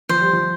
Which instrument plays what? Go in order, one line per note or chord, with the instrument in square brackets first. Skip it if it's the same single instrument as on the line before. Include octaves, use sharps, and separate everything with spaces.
[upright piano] F3 [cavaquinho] C5
[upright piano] G3
F3